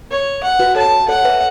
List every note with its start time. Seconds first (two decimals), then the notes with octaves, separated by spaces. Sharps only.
0.11 C#5
0.43 F#5
0.59 F#4 B4
0.75 A4 C#5 A5
1.08 A4 C#5 F#5
1.25 B4 E5